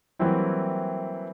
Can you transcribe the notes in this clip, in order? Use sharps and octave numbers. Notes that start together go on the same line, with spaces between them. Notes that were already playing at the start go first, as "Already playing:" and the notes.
E3 F#3 G3 A#3 C4 E4